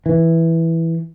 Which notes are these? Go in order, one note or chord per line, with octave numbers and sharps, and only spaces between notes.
E3